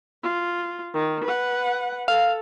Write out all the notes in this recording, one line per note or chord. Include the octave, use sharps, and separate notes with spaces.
F4
D#3
B4 F#5
A4 F5